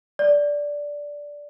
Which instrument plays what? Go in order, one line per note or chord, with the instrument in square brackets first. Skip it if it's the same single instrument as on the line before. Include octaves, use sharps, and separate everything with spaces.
[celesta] D5